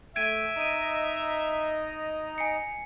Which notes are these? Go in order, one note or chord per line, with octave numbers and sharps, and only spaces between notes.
A3 E5 G5 G#6 D7 D#7
D#4 D#5 A#5 D7 D#7
G#5 C7 C#7